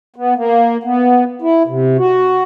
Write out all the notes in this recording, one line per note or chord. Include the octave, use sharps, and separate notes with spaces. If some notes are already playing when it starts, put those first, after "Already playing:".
B3
A#3
B3
E4
C3
F#4